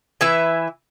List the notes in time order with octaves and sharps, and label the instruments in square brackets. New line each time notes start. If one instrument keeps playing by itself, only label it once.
[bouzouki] E3 E4 B4 E5